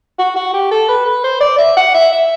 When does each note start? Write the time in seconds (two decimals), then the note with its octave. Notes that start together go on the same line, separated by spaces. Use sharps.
0.19 F#4
0.36 F#4
0.54 G4
0.71 A4
0.88 B4
1.06 B4
1.24 C5
1.41 D5
1.58 E5
1.77 F#5
1.94 E5
2.12 E5